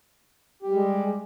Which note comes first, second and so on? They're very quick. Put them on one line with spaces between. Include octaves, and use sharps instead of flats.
G4 G3 G#3